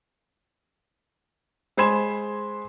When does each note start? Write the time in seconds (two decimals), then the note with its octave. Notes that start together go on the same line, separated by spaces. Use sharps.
1.77 G#3 C5 B5 C6 G#6 E7